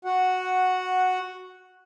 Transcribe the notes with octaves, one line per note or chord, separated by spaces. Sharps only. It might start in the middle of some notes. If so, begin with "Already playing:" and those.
F#4 F#5